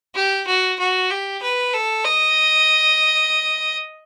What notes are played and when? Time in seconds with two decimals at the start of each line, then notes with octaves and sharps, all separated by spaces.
0.15 G4
0.47 F#4
0.79 F#4
1.10 G4
1.42 B4
1.74 A4
2.05 D#5